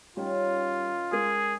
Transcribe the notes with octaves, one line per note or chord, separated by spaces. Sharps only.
D#3 G3 C#4 F4
G#3 G#4 A#4